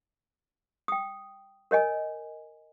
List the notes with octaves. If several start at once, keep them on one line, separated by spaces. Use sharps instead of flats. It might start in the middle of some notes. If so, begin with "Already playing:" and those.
G5 D#6
A#4 C#5 D#5 G#5